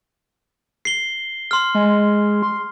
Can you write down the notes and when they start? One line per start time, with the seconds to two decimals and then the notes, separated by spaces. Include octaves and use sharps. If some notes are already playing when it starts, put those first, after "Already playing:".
0.85 C7 G7
1.51 C6 F6
1.75 G#3
2.42 C6